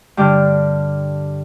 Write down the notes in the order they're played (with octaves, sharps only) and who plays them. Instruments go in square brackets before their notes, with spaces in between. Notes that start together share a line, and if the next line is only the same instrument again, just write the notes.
[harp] G2 D3 G4 D5 F6